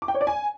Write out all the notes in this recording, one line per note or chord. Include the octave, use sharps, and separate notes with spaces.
D6
G5
C#5
D5
G#5